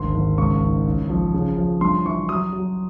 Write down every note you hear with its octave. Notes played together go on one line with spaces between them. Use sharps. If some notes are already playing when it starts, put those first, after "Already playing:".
Already playing: G#1 D2 C6
G#1
C#2 C#6
D#3
A1
F3
C#3
F3
G2 C6
E3 C#6
F#3 D#6
F#3